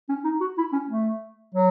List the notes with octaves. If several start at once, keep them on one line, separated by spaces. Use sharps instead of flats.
C#4
D#4
F#4
E4
C#4
A3
F#3